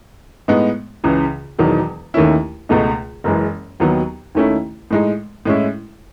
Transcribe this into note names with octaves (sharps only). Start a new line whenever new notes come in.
A2 G#3 B3 D#4
C#2 C#3 E3
E1 E2 D#3 F#3
D#2 D#3 A3 C#4 E4
C#2 B2 A3 D#4
F#1 F#2 E3 G#3
D#2 D#3 F#3 B3
D#2 D#3 A3 C#4 E4
A2 G#3 D#4
A2 G#3 C#4 E4